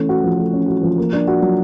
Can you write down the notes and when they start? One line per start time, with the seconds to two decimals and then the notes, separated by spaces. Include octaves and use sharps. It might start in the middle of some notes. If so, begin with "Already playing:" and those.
Already playing: E3 A3 C#4
0.09 F#4
0.24 F3
0.38 A3
0.53 C#4
0.68 F#4
0.83 F3
0.98 A#3
1.13 D4
1.28 F#4
1.42 F#3